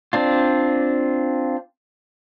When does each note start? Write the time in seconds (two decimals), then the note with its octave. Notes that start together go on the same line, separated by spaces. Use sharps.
0.13 C4 D4 F4